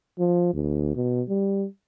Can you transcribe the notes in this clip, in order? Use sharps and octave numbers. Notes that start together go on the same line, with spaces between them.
F3
D2
B2
G3